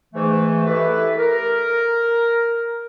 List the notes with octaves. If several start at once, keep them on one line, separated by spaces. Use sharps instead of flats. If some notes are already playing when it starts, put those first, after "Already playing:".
G#2 E3 A3
E4 G4 A4 B4
A#4